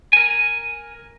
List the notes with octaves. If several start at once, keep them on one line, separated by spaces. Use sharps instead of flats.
A#4 G#5